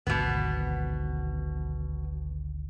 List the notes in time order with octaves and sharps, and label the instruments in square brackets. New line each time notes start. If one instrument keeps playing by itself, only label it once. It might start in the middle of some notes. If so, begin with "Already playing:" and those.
[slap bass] G#1 D2 [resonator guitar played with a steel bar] B2 B3